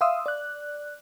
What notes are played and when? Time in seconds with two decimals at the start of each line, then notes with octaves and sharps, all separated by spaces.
0.01 E5 F5 C6 D#6 E6
0.26 D5 F#6